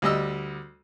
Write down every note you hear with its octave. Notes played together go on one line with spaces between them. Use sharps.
D2 G3 D#5 E6